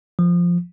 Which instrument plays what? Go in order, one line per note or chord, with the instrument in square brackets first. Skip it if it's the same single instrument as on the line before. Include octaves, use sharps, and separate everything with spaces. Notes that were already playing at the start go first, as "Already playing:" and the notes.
[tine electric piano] F3